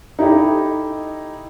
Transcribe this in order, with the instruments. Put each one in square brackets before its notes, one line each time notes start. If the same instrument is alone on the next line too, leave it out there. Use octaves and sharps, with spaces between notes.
[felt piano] D#4 E4 G4 A4 D#5